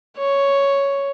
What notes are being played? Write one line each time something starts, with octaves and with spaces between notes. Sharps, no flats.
C#5